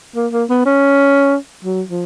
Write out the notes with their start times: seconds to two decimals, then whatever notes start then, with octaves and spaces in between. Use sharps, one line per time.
0.16 A#3
0.33 A#3
0.49 B3
0.66 C#4
1.65 F#3
1.90 F3